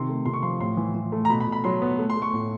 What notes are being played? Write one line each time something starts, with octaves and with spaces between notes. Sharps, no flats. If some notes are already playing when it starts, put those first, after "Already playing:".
Already playing: C3 D#3 C6
A3
C3 C6
C#6
F3 C6
A2 C6
E3
E3
A3
A#5
B2 B5
B5
B2
B5
F#3 C6
B3
A3
C6
A3
C#6
A2